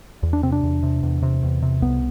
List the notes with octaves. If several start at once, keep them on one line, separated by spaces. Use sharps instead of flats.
E2
D4
C3 C4
D4
E2
C3
E2
C3
E2
C3
C2 B3